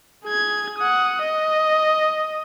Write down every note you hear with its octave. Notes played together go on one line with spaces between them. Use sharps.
G#4 G#6
F#5 D#6
D#5